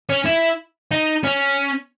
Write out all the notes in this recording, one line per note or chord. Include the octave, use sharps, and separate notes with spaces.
C#4
E4
D#4
C#4